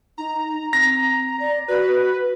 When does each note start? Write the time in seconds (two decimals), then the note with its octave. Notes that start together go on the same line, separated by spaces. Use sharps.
0.18 D#4 A#5
0.73 C4 A#6
1.39 D5
1.68 F#4 B4